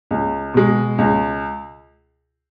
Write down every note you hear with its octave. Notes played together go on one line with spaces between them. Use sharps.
C#2
B2 G#3
C#2